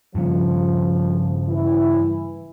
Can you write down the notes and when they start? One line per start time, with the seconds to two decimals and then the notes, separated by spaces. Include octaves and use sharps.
0.15 G2 C#3 F3
1.47 E3 E4